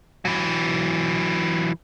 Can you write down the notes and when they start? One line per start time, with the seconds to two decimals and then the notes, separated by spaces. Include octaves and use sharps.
0.25 E3 F#3